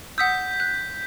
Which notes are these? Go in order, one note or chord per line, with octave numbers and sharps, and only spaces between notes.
F#5 D#6 E6 G6 B6
F#6